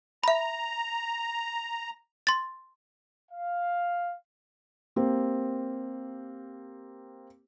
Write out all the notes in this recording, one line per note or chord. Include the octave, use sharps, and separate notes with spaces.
E5 A#5 B5
C6 A6
F5
A#3 C4 G4